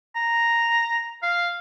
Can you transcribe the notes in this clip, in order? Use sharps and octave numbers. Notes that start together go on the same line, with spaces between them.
A#5
F5